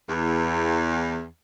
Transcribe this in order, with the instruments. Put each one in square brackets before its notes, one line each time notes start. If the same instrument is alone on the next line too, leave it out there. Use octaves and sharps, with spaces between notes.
[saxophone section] E2